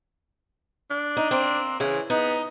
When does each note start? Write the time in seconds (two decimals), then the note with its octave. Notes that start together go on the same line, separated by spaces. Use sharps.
0.90 D4
1.17 D#4
1.31 A#3 C4
1.80 C#3 E3
2.10 B3 D#4